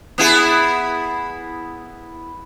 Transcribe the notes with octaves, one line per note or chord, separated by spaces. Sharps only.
B3 E4 G#4